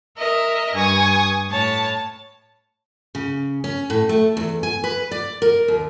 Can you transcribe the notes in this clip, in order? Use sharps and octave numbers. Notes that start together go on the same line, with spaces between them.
A#4 D#5 E5
G2 G#5 C#6 D#6
A2 C#5 A5
C#3
C#4
A2
A3
E2
G#5
B4
D5
A#4
D#2